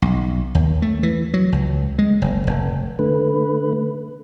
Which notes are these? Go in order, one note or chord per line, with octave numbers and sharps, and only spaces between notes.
B1
D#2
A3
E3
F#3
C#2
G#3
F#1
F1
D3 A3 B4